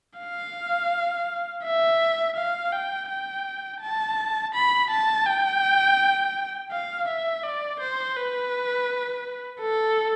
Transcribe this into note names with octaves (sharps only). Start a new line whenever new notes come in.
F5
E5
F5
G5
G5
A5
B5
A5
G5
F5
E5
D5
C5
B4
A4